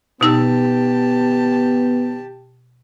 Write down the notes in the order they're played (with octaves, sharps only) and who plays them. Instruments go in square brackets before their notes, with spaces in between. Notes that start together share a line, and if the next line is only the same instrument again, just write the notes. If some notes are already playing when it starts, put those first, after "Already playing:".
[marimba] B2 D#4 E6 [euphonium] B3 [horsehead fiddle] G4 A5